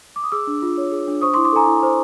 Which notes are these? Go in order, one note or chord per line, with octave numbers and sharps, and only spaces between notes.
D6
D#6
G#4 D6 E6
D4
F4
C#5
G#4
D4
C5 C#6 D#6
C6 D6
E4
C6 D6
A4 G#5 A#5
E4
C5